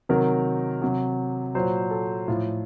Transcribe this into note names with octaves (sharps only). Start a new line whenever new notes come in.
C3 D#3 F#3 A#4
C3 F#3
A#2 F#3 C5
A4
A2 F3 F4